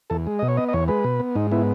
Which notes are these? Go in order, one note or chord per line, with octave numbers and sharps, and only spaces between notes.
E2 A4
G#3
B2 D#5
C#5
B3 D#5
D#5
E2 C#5
G#3 B4
B2
B3
G#2 D#4
B3 E4